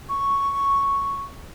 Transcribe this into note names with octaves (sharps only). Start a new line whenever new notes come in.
C#6